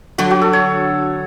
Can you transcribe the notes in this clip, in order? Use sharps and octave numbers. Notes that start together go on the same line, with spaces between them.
D3 F#3 F#4
F#4
A4
C#5